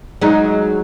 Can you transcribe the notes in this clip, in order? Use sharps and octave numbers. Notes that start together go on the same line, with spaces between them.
F#3 G#3 D#4